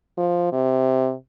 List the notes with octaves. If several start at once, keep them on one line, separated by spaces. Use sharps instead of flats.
F3
C3